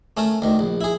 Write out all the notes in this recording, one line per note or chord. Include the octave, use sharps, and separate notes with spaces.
A3 C#4 A#4 A5
D2 D#3
A#1
E4 G#4